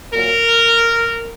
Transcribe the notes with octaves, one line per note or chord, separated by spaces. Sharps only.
A#2 F#3 A#4